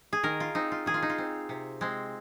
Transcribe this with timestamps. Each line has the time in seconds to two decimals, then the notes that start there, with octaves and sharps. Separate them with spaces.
0.13 G#4
0.23 D#3 A#4
0.40 F4
0.55 C4 D#4
0.72 F4
0.86 D#3 G#4
0.94 F4
1.02 D#4
1.10 F4
1.18 C4
1.49 C3
1.81 G#3 C4